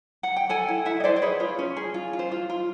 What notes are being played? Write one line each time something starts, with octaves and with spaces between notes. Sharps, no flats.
F#5
G5
A4 F#5 G#5
E4
E4 E5 F#5
D#5
E4 C5 D5
C5
G#4 B4 C#5
F4
C#4
G#4
F4
F4
C5
F4
F4